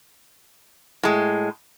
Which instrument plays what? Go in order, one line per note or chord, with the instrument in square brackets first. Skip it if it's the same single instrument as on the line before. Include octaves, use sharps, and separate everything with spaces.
[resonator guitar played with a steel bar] A2 G#3